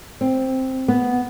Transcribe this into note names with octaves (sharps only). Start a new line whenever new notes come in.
C4
B3